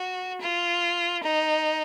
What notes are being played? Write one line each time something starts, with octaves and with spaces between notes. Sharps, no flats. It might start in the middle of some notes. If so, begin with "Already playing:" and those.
Already playing: F#4
F4
D#4